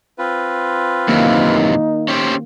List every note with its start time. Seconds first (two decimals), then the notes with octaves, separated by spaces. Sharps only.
0.18 C4 F4 B4
1.08 F#2 C3 D#3 E3 A#3 D#4
2.08 C#4 G4 C5